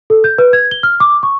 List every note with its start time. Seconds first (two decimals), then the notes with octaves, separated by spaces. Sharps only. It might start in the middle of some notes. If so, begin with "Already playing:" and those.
0.10 A4
0.24 G6
0.38 B4
0.53 G#6
0.71 G7
0.83 F6
1.00 D6
1.23 C#6